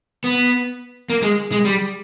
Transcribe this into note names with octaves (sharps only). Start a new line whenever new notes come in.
B3
A#3
G#3
G#3
G3